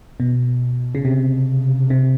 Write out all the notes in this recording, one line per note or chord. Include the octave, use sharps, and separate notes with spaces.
B2
C#3
C3
C3